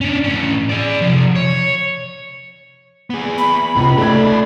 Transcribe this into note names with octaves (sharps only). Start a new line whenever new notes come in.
C#4 D4
A2 C#4
G#4 D5
C3 F3
C#5
B3 G#4
B5
C#2 C3
A3 D#4 D5 G#6